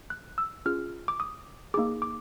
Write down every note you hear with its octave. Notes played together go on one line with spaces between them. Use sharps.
F#6
E6
C#4 F4 G#4 F6
D6
D#6
A#3 D#4 G#4 D6
D6